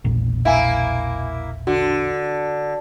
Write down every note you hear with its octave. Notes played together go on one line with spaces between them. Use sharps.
E1 A#1 A#2
A#3 E4 E5 F5 G#5
D3 F#4